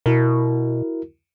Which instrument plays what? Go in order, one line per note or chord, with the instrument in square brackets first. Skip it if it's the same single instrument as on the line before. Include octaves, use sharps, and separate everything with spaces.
[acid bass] B2 [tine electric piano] E4 F#4 A#4